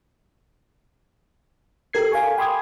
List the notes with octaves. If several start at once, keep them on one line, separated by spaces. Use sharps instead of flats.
G4 A4 A#4 G#6 C7
F5 G#5 C#6
G5 B5 C6 D6 D#6 G#6